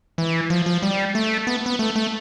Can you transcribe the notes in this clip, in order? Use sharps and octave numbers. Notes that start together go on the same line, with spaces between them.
E3
F3
F3
G3
A3
B3
B3
A3
A3